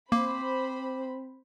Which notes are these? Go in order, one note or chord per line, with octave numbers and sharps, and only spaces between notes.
A#3 C4 C5 B5 D6